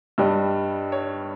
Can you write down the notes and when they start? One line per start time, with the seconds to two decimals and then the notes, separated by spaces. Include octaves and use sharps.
0.18 G2 G3 D#5
0.92 C#5